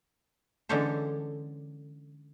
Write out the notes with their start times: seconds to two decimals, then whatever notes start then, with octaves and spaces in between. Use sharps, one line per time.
0.69 D3 E3 G#3 C#4 A4 C5